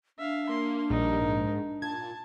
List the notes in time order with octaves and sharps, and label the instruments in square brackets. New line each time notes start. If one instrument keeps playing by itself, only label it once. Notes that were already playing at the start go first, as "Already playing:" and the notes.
[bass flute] D4 [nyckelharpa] E5 F5
[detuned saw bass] A#3 [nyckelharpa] C6
[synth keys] A#1 [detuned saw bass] G3 [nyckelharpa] D#4 A#4
[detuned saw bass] G#2
[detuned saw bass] A#2 [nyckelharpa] A5 [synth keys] G#6